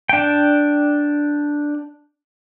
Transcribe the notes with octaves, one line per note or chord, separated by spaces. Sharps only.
D4 G5